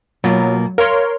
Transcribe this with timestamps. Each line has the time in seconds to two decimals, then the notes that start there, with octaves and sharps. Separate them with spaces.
0.24 B2 F#3 A#3 F4
0.78 A#4 C#5 F5 C6